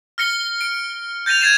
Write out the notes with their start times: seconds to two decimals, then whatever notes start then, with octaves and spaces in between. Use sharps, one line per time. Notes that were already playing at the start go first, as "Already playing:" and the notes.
0.18 F6 A#6 C#7 G7
0.61 D7
1.26 G6 A6 A#6 D#7 F7
1.41 G#6 A6 C7 D#7 E7